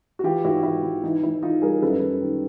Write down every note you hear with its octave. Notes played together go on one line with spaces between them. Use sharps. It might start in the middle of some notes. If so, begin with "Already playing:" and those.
F#4
E3 F4 G4
G#2 E4 F#4
E3 E4
E3
E3 D#4
E3 E4
E3 D#4 F4
G3 G#4 A#4
F#2 A4 B4
F#2
D#3